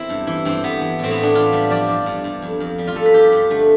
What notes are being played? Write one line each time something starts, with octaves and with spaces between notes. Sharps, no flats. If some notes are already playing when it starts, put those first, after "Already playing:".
Already playing: E2 C4 E4
G2
E3 E4
G2 C4
G2 B3
E3
A2 C4
B3
A2
D4
E3 F4
G3
F3 D5
G2
G2
G2
F2
F2
G3
F4
F2 A4
B4
G2 G4
G2
D3 A3